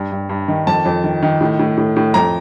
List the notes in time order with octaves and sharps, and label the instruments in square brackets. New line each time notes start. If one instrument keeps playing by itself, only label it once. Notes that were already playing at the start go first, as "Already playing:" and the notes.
Already playing: [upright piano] G2
G2
G2
D#3
F2 A5
F2
D#3
D#3
A2
A2
A2
A2
F2 A#5